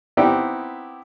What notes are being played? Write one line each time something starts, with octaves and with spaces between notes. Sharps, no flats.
B3 C4 D#4 E4 G4 G5